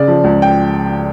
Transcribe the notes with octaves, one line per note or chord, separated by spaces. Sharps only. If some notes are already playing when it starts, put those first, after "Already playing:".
Already playing: C#3 D5
F3
C#2
G5